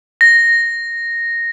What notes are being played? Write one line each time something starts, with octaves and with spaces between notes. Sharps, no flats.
A#6